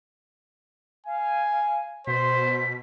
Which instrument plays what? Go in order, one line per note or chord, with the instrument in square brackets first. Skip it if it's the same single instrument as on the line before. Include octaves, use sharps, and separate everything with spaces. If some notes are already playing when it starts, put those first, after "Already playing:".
[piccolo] F5 [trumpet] G#5
[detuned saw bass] B2 [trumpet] C5 [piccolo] B6